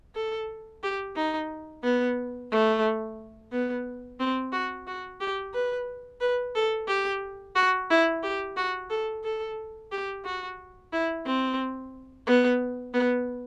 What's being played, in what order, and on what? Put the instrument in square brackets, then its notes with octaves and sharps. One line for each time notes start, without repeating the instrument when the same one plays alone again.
[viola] A4
G4
D#4
B3
A3
B3
C4
F#4
F#4
G4
B4
B4
A4
G4
F#4
E4
G4
F#4
A4
A4
G4
F#4
E4
C4
B3
B3